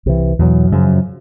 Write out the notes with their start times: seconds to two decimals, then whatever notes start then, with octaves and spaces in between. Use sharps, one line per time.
0.06 C2 C3 E3
0.39 E2 B2 F#3
0.72 F#2 C#3 F3